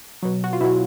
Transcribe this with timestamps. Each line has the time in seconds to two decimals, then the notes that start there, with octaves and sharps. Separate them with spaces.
0.23 B2 F#3
0.44 F#4
0.53 F4
0.61 B2 F#3 E4